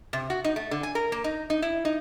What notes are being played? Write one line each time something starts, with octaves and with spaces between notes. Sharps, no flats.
C3
F#4
D#4
A3
D3
G#5
A#4
A#3
D#4
D#4
E4
D#4